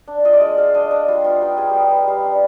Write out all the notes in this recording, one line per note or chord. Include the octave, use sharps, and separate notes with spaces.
D4
F4 D#5
D5
G#3
G#3 F5
D4 D#5
D4 D5
G3 F4
B3 F4
D#4 G4
G3 G#4
B3 G4
G4
B3 G#4
G3 F5
D4